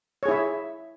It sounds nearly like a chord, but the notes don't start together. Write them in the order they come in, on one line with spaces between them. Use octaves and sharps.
C#5 G#4 E4 E5